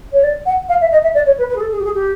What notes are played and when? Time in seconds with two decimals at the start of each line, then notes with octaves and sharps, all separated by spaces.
0.12 C#5
0.23 D5
0.45 F#5
0.68 F5
0.80 E5
0.91 D#5
1.03 E5
1.14 D5
1.26 C#5
1.38 B4
1.49 B4
1.55 G#4
1.60 A4
1.72 G#4
1.79 G4
1.84 G#4
1.94 G4